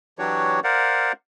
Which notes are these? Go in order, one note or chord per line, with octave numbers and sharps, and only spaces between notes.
E3 F#3 D4 F#4 G4 C#5
A#4 C5 D5 F5 F#5